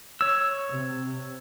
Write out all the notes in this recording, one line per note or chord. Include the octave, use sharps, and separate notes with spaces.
C#5 E6
C3